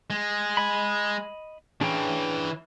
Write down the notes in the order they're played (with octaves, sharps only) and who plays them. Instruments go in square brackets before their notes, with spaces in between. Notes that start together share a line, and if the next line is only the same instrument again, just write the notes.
[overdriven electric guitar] G#3
[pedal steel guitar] D#5 B5
[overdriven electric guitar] E3 C#4 [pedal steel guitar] D4 G#4 G5